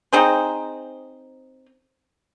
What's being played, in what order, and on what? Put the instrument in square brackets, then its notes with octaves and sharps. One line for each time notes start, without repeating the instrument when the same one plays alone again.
[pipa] C4 D#4 G#4 C5